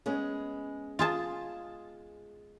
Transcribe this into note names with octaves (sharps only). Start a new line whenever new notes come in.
G#3 B3 C#4
F4 G#4 A5